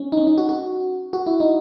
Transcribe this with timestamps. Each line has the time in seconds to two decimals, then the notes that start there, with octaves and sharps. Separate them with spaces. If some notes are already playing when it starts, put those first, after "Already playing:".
Already playing: C#4
0.12 D#4
0.17 C#4
0.27 D#4
0.38 F#4
0.49 F#4
1.13 F#4
1.27 E4
1.40 D#4